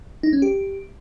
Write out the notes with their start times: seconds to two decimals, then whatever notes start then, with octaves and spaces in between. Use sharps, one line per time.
0.23 D#4
0.33 C#4
0.42 G4